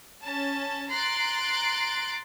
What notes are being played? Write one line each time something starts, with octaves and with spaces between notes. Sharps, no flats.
C#4 A5
A#5 C6 F#6 A6 D7